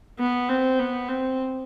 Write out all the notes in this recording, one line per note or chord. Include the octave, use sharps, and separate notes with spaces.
B3
C4
B3
C4